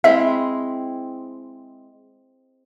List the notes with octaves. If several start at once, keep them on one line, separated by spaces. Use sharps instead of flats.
G#3 C4 E4 E5